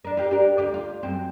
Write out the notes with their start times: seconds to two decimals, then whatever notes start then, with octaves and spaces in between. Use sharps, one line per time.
0.05 D4 A#4
0.17 F4 G4 A#4
0.31 D4 G4 A#4
0.58 D2 G4 D5
0.74 F4
1.03 F#2 C4